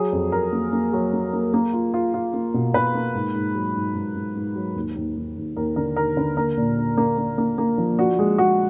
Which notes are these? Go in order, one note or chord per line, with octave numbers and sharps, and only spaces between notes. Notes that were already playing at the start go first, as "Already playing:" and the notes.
Already playing: F#3 G#4
F2
F2 A#4
A#3
A#3
F#3
A#3
A#3
A#3
F4
F4
F4
A#3
B2
B2 B4
A#3
G#2
G#2
F#3
G#2
G#2
G#2
G#2
F#3
D#2
D#2
D#2
D#2
D#2 A#4
D3 A#4
D#2 A#4
D3 B4
A#3 A#4
A#2
D4
A#3
A#3
A#3
A#3
F3
D4 F#4
G#3
G#3 F#4